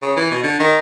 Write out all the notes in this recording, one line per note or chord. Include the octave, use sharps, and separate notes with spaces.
C#3
E3
B2
D3
D#3